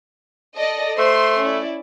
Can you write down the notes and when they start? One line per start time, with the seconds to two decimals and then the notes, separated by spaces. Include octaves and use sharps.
0.56 A4 D5 D#5
0.98 A3 C5 C6
1.42 C#4 E4 D5